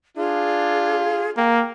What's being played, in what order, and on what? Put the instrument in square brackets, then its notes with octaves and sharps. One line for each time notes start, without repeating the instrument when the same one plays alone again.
[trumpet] D4 [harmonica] F4 [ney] G#4
[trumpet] A#3 [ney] G5